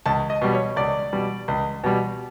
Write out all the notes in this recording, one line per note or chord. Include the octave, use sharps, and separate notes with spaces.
C#2 A5
D#5
B2 G3
C#5
C#2 D5
B2 G3
C#2
B2 G3